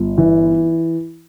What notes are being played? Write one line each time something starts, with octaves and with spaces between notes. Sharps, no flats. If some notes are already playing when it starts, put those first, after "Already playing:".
Already playing: G1
E3